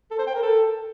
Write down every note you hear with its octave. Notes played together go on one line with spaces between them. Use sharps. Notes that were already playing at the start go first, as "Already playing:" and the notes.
A4
C5
G5
A#4
A4